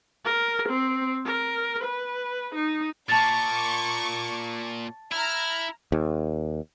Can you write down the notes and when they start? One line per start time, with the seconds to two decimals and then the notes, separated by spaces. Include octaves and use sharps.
0.25 A#4
0.69 C4
1.26 A#4
1.84 B4
2.55 D#4
3.09 A#2 A5 C#6 D6 A6
5.12 E4 A#5 F6
5.92 D#2